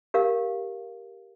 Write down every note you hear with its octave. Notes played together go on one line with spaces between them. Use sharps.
G4 A#4 F5